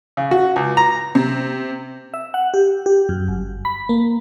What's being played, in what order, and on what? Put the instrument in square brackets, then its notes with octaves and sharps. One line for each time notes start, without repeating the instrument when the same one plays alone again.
[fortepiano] C#3
F#4
C#2
A#5
[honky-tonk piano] C3
[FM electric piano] E5
F#5
G4
G4
F#2
G1
B5
A#3